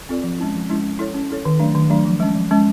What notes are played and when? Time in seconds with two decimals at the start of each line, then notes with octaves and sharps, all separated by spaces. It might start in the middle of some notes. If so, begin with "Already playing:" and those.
0.09 C4 F4 A4 D5
0.23 F3
0.39 G#3 C#4 E4
0.55 F3
0.69 G#3 C#4 E4
0.84 C#4
0.99 E4 A4 C#5
1.14 C#4
1.30 E4 A4 C#5
1.45 D#3
1.60 F#3 A3 D4
1.75 D#3
1.90 F#3 A3 D4
2.05 F3
2.20 G#3 C#4
2.35 F3
2.51 G#3 C#4